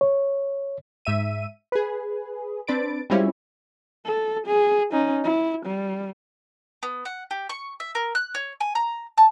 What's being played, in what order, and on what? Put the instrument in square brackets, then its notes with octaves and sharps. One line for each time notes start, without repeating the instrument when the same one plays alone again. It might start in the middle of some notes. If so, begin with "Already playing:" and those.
[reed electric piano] C#5
[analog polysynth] G#2 E5 D#7
G#4 B4
C4 D4 B4 A6 D7
G3 G#3 C4 C#4 E4 F4
[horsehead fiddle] A4
G#4
C#4 D#4
E4
G3
[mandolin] B3
F#5
G4
C#6
E5
A#4
F#6
C#5
G#5
A#5
A5